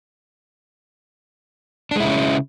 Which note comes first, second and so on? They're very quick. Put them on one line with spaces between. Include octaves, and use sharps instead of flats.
D4 G#3 E4 C#3 C#4